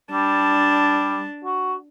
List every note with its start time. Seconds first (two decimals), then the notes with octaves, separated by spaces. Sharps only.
0.11 G3 D4 A5
1.44 F#4